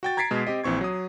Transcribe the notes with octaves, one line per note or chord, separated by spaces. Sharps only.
F#4 G5 A6
A#5 G#6 A6 B6 C7 D7
B2 G#3
C4 G4 D#5
A#1 E3 C4 C#6 G#6
F#3 D#6